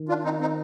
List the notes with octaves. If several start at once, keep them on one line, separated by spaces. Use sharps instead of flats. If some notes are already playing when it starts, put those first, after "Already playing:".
Already playing: D#3
D4 F4
C4 D#4
C4 D#4